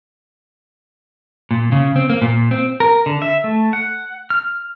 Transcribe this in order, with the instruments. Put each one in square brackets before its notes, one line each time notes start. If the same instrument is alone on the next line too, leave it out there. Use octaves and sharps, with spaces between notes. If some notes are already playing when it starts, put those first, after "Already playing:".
[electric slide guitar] A#2
C#3
C4
A#3
A#2
C4
[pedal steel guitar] A#4
D3
E5
A3
F#5
F6